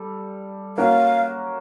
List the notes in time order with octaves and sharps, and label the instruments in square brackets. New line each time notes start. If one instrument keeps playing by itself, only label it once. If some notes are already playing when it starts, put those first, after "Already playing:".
Already playing: [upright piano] G3 A4
[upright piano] A#3 C#4 F#4 A#4 [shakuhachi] F5